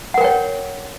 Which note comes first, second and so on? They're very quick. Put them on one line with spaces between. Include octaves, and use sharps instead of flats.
F#5 A#4 G5 C#5